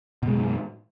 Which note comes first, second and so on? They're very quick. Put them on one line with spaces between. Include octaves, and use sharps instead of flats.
B2 G#3 F#2 D#3